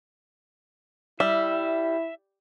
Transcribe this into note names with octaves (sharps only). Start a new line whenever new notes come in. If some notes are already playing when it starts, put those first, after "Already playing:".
G3 E4 E5